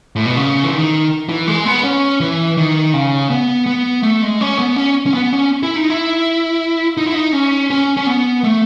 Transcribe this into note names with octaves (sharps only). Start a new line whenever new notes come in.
A2
B2
C#3
E3
D#3
E3
G#3
B3
C#4
E3
D#3
C#3
B3
B3
A3
G#3
C#4
B3
C#4
C#4
B3
C#4
E4
D#4
E4
D#4
E4
D#4
C#4
C#4
C#4
B3
A3